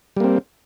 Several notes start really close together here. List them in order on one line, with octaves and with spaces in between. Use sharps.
G3 A#3 C4